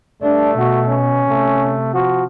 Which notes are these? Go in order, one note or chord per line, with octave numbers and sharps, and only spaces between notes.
G2 A3 D4
B2 F#4
C#4
C3 A3
F3 F#4